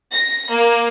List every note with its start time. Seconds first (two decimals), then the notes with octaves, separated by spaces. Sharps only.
0.13 A#6
0.53 A#3